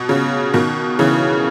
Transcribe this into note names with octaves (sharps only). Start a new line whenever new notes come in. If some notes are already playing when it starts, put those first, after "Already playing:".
Already playing: B2
C#3
B2 D#3
C#3 E3